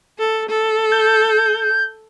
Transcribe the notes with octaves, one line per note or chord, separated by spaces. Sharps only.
A4
A4
G6